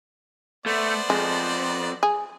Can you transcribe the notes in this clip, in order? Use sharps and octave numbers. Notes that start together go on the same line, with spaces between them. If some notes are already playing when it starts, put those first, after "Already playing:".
A3 B3 C5 D5
F2 G#3
G#4